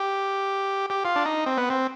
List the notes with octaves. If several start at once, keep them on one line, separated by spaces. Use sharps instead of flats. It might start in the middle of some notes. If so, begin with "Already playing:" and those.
Already playing: G4
G4
F4
D4
D#4
C4
B3
C4